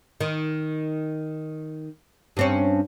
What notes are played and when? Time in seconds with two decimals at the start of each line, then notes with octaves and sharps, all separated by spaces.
0.21 D#3
2.37 G2 C4 C#4